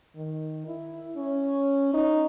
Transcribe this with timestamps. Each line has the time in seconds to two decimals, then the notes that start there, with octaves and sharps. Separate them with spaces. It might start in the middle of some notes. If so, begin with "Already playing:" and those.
0.15 D#3
0.67 E4
1.16 C#4
1.94 D#4